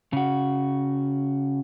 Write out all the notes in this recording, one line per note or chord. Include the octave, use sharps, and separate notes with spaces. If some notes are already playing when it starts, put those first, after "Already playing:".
C#3 F#4